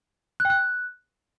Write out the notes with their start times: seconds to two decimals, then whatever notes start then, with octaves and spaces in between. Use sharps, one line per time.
0.40 F#6
0.45 G5
0.50 F#6